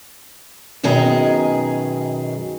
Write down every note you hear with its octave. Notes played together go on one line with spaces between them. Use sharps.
F#2 B2 D#3 G#4 D#5 A#5